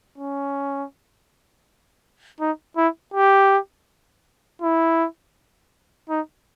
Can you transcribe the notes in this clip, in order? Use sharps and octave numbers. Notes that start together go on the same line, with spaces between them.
C#4
D#4
E4
G4
E4
D#4